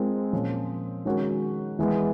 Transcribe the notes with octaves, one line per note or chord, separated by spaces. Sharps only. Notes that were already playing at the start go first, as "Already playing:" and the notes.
Already playing: G#3 C4 F4 A#4
A#2 F3 A#3 C#4 F4
D#3 G#3 C#4 F#4 A#4
E3 G#3 B3